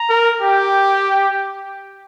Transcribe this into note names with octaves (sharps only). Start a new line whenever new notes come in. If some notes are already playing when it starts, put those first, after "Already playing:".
Already playing: A#5
A#4
G4 G5